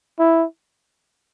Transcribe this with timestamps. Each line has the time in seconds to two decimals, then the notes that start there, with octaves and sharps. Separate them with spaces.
0.19 E4